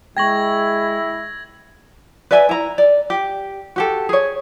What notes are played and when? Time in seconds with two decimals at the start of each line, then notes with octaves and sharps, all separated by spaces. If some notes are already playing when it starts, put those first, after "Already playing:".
0.17 G#3 E4 G5 C#6 G#6 A#6 F#7
2.31 B4 D5 E5 G#5
2.49 E4 A#5
2.78 D5
3.10 G4
3.76 F#4 G4 A4
4.09 G#4 C#5